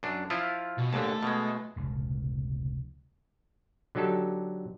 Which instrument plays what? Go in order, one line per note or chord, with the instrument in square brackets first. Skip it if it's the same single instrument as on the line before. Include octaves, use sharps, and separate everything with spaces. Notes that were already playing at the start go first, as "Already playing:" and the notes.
[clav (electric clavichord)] F#2 D4
F3 E4 F4
[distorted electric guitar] B2
[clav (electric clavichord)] D#2 G#2 D3 [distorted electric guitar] A3 A5
[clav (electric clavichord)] B2 G#3
[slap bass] F1 C#2 A#2
[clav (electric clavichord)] D3 F#3 D#4 G4 A4